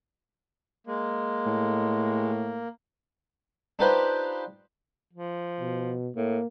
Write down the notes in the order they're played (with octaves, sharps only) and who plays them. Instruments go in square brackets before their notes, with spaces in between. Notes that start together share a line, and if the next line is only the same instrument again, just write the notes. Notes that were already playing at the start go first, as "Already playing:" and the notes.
[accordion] G#3 [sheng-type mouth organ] A#3
[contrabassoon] A2
[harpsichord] D4 D#4 F4 G4 B4 C5
[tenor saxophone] F3
[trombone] B2
[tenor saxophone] A2 [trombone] A#3